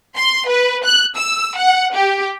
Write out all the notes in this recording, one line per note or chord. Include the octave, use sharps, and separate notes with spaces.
C6
B4
F#6
E6
F#5
G4